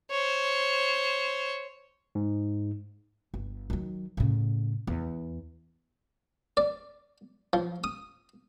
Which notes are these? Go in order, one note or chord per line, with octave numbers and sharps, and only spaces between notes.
C5 C#5
G#2
G1
D#3 F#3
A2 C#3
E2
D5
F3
D#6